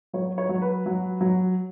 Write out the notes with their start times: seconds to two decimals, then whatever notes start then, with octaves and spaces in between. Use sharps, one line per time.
0.13 F#3 C#5
0.38 C#5
0.49 F#3
0.62 B4
0.86 F#3
1.21 F#3